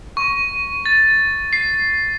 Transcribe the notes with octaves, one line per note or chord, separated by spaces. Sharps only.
C#6
A6
C7